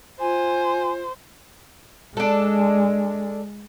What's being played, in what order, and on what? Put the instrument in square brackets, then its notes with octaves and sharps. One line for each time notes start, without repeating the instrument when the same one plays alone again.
[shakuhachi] F4 [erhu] C5 [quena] G#5
[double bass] G#3 [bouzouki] D4 A4